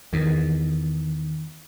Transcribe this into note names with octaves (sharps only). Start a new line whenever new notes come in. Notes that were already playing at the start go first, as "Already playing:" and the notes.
E2 D#3